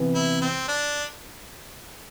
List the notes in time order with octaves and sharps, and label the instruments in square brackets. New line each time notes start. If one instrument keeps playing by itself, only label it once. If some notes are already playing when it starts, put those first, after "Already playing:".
Already playing: [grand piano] C3 E3 B3
[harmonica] E4
C4
D4